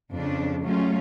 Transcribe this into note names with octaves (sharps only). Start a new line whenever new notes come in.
F2 C#3 D4
F#3 G#3 A3 C#4 F4